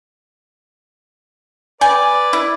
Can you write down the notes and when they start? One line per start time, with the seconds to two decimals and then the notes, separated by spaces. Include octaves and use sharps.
1.81 B4 D5 G5 G#5
2.33 E4